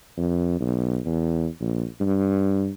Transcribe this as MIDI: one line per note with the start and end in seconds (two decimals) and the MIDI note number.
0.17 0.56 41
0.60 0.99 35
1.05 1.47 40
1.61 1.85 34
2.01 2.70 43